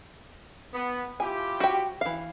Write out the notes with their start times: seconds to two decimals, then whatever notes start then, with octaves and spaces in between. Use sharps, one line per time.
0.74 B3
1.20 E4 F4 G4 G#5
1.60 F#4 G5
2.01 E3 F5